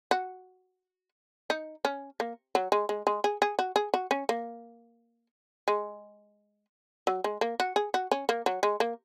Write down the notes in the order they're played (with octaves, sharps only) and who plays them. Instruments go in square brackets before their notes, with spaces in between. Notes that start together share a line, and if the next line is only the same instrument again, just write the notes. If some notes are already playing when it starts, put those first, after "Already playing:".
[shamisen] F#4
D#4
C#4
A#3
F#3
G#3
G#3
G#3
G#4
G#4
F#4
G#4
F#4
C#4
A#3
G#3
F#3
G#3
A#3
F#4
G#4
F#4
C#4
A#3
F#3
G#3
A#3